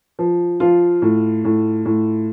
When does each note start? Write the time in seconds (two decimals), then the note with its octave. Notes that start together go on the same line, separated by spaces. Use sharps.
0.19 F3
0.60 F3 F4
1.02 A2
1.45 A2
1.85 A2